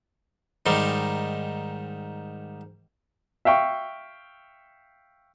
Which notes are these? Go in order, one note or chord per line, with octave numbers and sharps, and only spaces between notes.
G#2 D#3 G3
E5 F5 G5 C#6